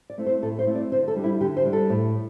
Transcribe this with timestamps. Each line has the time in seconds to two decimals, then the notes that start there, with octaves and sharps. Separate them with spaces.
0.10 D5
0.18 A3 C4 E4
0.26 C5
0.42 A2 A4
0.59 C5
0.67 A3 C4 E4
0.75 D5
0.91 D3 C5
1.08 A4
1.16 G3 D4
1.24 E4
1.41 D3 G4
1.57 C5
1.65 G3 D4
1.73 A4
1.90 A2